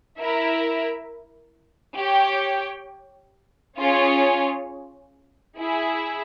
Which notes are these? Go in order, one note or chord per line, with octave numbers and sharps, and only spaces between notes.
E4 A#4 E5
G4 C#5 G5
C#4 F4 G#4 C#5
E4 G#4 E5